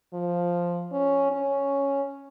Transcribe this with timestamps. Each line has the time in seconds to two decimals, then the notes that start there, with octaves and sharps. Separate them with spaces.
0.14 F3
0.92 C#4
1.31 C#4